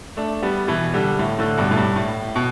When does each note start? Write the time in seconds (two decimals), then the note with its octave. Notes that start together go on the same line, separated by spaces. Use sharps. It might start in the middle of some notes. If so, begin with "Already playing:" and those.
0.17 A3 D4
0.42 G3 B3
0.68 B2 E3
0.94 D3 G3
1.19 A2
1.39 A2 D3
1.58 G2 B2
1.71 A2
1.77 G2
1.96 A2
2.36 B2